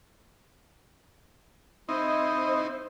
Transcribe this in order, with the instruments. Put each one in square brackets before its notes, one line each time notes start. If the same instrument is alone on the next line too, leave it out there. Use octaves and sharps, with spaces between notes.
[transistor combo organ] C4 D#4 [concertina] E4 D#5 [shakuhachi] C5